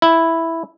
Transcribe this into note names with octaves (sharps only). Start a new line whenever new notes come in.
E4